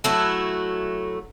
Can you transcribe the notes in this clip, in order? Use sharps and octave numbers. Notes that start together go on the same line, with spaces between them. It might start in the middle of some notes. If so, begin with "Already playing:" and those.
F#3 A3 E4 F#4